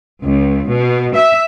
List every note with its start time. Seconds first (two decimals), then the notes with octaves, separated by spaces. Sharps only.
0.23 C#2
0.68 B2
1.15 E5